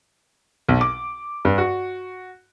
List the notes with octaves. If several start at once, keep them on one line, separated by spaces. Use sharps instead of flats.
B1
D6
G2
F#4